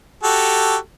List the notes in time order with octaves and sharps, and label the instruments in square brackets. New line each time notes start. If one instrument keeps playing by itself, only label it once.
[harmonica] F#4 G4 A4